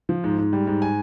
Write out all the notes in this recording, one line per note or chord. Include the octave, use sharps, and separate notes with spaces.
F3
G#2
G#2
G3
G#2
G#5